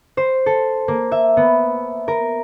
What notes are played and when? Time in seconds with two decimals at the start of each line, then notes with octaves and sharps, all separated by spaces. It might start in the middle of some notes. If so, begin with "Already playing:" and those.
0.17 C5
0.46 A4
0.88 A#3
1.12 E5
1.37 B3
2.08 A#4